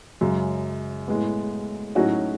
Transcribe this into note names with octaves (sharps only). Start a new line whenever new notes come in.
F#2 C#3 G#3
A2 G#3 B3
A2 F#3 C#4 D#4 F#4